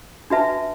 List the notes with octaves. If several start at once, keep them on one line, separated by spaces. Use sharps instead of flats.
D4 F#4 B4 E5 A5